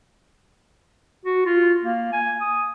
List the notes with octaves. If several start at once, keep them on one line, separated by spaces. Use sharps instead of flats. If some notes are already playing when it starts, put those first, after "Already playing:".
F#4
F4
A#3
G#5
D#6